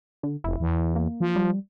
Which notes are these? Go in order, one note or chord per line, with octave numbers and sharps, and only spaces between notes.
D3
F1 E4
E2
A#3
F3
G3